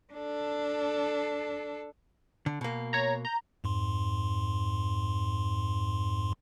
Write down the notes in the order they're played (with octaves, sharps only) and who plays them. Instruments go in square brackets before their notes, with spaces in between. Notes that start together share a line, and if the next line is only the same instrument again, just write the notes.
[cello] D4 A4
[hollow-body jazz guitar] D3
B2 A#3
[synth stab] C#5 A#5
A#5 G6
[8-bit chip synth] F2 G#2 C6